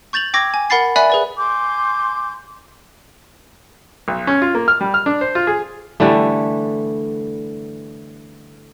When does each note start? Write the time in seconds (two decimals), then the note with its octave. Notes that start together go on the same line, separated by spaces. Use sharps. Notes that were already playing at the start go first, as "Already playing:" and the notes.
0.13 C#6 G6 A6 F7 F#7
0.34 G5 C#6 D6 E6 G#6 A#6
0.54 G#5
0.70 A#4 F#5 B5 A6 C7
0.96 D5 E5 G#5 B5 F#6
1.10 G#4 B4 D5
1.38 G#5 C6 D6 G6
4.08 B1
4.27 C#4
4.42 F4
4.55 A#3
4.68 F6
4.81 G3
4.94 F6
5.06 D4
5.21 C5
5.35 F4
5.47 G#4
6.00 D3 E3 G3 A3